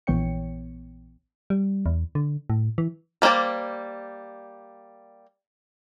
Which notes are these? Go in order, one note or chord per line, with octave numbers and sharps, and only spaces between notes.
A#1 E3 B3 C#5 G5 C#7
G3
E2
D3
A2
E3
G3 A#3 D4 C5 D5